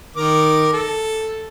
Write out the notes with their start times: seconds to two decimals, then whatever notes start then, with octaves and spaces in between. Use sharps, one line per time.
0.16 D#3 A#4 D6
0.73 A4